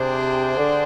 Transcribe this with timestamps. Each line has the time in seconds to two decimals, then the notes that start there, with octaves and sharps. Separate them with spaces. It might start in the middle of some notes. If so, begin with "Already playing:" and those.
Already playing: C3 D4 G#4 C5 G5
0.57 D3